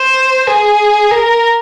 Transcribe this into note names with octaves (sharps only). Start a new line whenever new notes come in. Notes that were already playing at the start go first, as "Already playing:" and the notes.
Already playing: C5
G#4
A#4